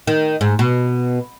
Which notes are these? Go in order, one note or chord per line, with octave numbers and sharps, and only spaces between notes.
D#3
G#2
B2